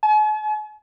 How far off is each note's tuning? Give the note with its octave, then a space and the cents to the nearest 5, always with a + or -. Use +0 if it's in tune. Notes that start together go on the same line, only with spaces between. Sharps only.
G#5 +45